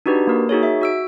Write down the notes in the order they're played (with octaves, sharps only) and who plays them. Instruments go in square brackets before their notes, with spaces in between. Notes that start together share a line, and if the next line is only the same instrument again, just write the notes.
[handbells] D4 D#4 F#4 G4 B4
A#3 A#4
D#4 F#4 G#4 C#5
E5
F#4 E6 D7